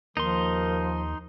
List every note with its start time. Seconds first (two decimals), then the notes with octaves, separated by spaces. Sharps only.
0.17 D#2 F3 D#4 A#4 C6